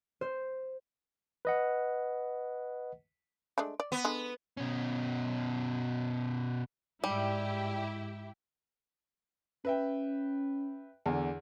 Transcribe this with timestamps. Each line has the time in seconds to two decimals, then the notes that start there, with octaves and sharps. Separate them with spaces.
0.21 C5
1.45 B4 D#5 F#5
3.58 G#3 A3 D4
3.80 D5
3.92 B3
4.05 D3 G#3
4.57 B2 C#4
7.04 G#2 G3 E4 G4 E5
9.65 C#4 B4 E5 G5
11.06 E2 D3